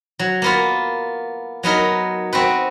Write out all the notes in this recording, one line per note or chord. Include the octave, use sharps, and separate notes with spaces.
F#3
A#3 B3 F4
F#3 B3 D#4 A#4
C4 F#4 B4